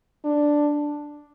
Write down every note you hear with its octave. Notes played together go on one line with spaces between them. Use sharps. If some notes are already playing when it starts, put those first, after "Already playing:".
D4